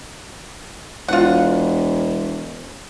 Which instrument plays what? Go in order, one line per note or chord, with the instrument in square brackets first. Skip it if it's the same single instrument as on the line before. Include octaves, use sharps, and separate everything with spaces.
[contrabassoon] E1 [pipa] F4 F#5